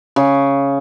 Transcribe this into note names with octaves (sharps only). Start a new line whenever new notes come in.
C#3